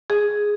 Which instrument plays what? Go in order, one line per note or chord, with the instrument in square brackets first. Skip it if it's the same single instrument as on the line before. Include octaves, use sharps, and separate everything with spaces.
[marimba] G#4